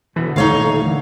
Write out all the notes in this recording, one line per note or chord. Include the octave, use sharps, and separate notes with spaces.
B2 D3 E3
D#1 A3 D#4 C#5 F5
D3 E3